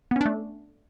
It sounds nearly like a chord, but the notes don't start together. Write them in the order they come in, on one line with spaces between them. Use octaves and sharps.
B3 C#4 D4 A3